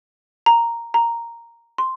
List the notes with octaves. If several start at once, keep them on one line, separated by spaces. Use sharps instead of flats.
A#5
A#5
C6